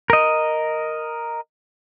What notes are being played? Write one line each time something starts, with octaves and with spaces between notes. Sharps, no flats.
A#4 D#5